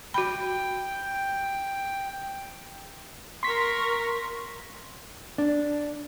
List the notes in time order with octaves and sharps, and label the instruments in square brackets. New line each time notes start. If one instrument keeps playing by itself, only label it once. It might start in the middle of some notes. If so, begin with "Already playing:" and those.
[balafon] F#4 B5 [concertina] G5
[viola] A#4 C#6 [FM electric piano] C6 B6
[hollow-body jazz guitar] D4